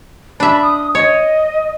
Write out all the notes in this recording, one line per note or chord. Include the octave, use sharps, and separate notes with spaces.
D4 E5 B5
D#6
C#5 D#5